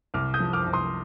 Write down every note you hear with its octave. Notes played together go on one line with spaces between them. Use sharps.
C2 D6 F6
D#6 G6
F3
D6 F6
C2
C6 D#6